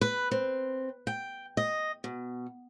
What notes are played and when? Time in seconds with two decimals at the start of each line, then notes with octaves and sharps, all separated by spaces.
0.01 B4
0.31 C4
1.07 G5
1.57 D#5
2.04 B2